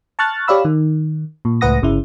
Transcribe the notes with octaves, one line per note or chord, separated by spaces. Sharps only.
A5 C#6 F6 F#6 A6
G4 C#5 D5 F5 B5 E6
D#3
A#2
C#2 A2 B4 F#5 D#6 A#6
G1 C#3 E4